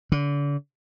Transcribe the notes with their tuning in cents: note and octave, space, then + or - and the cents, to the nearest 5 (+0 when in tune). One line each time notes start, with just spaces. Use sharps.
D3 -35